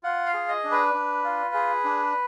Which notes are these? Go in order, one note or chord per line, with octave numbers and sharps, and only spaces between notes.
F4 F#5
F5
G#4
D#5
D4
B4
D4
F4
G#4
D4